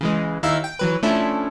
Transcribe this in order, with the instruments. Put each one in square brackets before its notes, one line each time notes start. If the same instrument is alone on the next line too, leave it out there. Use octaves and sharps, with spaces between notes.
[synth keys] C#3 E3 G#3
D#2 D#4 E4 F5 E6
G5
E3 F#3 B4
F3 A3 C#4 D4 E4 A4